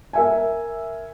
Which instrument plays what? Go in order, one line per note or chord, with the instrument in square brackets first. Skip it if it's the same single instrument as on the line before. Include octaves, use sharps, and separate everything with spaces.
[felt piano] A#4 E5 G#5